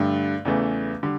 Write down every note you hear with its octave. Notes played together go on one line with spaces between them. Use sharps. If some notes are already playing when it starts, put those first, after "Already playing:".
Already playing: G2 D3 A3
E2 C#3 E3 A3
D3 G3